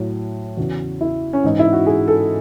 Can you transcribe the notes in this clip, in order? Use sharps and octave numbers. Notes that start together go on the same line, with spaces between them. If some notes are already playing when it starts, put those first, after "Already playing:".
Already playing: A2 F#3
E2 C#3 E3 F#4
E4
C#4
G#2 E3 D#4
E4
F#4
G#4
A4